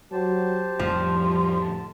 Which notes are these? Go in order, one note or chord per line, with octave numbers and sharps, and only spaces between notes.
F#3 G4 C5 A5
F2 A2 F3 G3
D3 A5